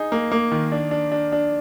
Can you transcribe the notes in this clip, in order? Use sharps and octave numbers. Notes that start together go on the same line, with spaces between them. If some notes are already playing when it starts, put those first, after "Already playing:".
Already playing: D#4 G#4
A#3
A#3
D#3
D4
D4
D4
D4